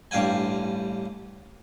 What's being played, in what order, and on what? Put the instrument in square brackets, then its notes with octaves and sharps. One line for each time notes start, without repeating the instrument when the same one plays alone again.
[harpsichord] A1 G2 F5 G5 G#5